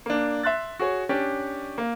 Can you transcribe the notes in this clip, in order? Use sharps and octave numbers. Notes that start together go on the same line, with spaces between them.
A#3 D4
E5 C6 F#6 A6
F#4 G#4 C#5
C#4 D4 G4 D5
A#3